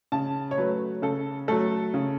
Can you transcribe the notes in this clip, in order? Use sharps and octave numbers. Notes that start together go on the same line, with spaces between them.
C#3 A5
C#5
F#3 A3 B4
C#3 A4
F#3 A3 A4
C#3